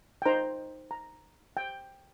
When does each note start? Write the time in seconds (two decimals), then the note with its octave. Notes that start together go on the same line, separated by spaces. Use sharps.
0.22 G5
0.25 D#4 C5 A#5
0.91 A#5
1.57 G5